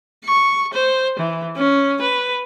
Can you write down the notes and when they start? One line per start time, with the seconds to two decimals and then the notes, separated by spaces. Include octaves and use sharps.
0.25 C#6
0.74 C5
1.19 E3
1.57 C#4
2.02 B4